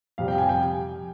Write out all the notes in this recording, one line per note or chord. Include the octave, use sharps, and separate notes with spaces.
F2 C3 G3 F5
G5
G#5
G5